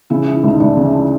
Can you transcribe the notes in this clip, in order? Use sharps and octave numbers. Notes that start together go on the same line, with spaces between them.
C#3 E4
E3
E4
D2 D#4
D2 D4
C#3
D4
E3